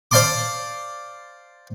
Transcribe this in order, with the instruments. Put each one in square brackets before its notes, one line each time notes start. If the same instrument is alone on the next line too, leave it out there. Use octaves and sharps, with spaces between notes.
[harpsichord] C5 D5 F5 A5 C6 D6